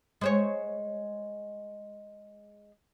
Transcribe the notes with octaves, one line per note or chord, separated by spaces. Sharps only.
G#3 C5 C#5